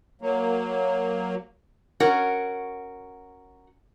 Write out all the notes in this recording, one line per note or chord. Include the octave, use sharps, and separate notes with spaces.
F#3 A#3
C#4 F#4 A#4